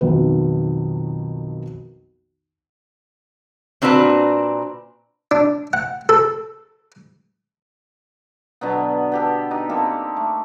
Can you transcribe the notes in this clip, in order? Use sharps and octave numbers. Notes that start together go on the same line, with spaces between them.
B1 F2 D#3 B4
A#2 C4 D4 F#4 B4
D4
F#5
A4
B2 D3 F#3 B3
B3 G4 A4
D#4 G4 B4
A#3 C4 G4 A4
A3